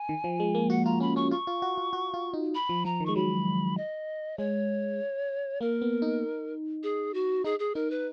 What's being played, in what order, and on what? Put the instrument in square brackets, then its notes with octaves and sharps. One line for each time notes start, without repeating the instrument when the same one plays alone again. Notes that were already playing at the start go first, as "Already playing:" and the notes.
Already playing: [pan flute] G#5
[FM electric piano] D#3
F3
G#3
A#3
[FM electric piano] F#4 [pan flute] F#5
[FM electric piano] F4 [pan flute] A#5
[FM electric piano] C#4 [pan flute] B5
[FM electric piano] C#4 [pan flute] C#6
[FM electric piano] F4 [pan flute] C#6
[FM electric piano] F4
F#4
F4
F#4
F4
D#4
[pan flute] B5
[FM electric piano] F3
[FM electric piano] F3 [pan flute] A#5
[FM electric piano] D#3
[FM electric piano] G#3 [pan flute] C#6
[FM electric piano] F#3 [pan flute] B5
[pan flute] D#5
[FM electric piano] G#3 [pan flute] C#5
[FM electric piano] A#3 [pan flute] A#4
[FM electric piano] B3
D#4
[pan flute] G#4
F#4
[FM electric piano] D#4 [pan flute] G#4
[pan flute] G#4
[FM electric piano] D#4 [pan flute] A#4
[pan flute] B4